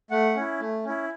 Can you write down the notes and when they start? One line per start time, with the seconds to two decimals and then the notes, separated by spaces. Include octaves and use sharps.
0.11 A3 F#5
0.36 C#4 E4
0.60 A3
0.85 C#4 E4